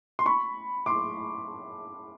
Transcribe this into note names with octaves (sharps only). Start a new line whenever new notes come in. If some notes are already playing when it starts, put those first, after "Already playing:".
C6
B5 C#6
C6 D6